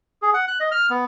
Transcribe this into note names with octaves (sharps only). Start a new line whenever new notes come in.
G#4
F#5
F#6
D#5
F6
B3